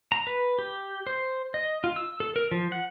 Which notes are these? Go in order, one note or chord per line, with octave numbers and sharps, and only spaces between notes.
A#5
B4
G4
C5
D#5
F4
E6
A4
A#4
F3
F#5